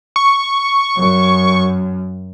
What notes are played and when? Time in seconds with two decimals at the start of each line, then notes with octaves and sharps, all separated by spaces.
0.16 C#6
0.97 F#2